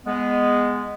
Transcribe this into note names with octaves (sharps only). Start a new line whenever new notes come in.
G#3 B3